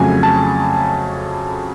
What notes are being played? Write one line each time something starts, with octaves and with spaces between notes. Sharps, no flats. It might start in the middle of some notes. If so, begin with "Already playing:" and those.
Already playing: F2 C#3 F#3 A3 G#5
A5